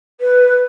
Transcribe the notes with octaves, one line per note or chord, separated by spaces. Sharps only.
B4